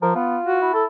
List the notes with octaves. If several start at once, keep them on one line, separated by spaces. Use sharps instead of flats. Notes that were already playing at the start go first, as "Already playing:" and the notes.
F3 A#4
B3 F4
F#4
E4
A4